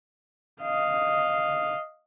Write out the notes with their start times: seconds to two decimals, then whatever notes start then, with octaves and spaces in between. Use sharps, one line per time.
0.62 D#5 F5